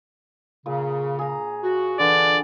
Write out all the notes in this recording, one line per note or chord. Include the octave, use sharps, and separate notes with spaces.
A#2 C#3
G#4 A#5
F#4
D3 E3 D4 D5